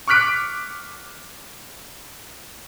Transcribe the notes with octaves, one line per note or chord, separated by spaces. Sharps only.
C#6 D6 F6 F#6 B6 D7